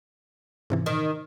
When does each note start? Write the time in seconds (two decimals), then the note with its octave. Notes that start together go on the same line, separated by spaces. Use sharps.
0.70 G#2 C3 E3
0.86 D#3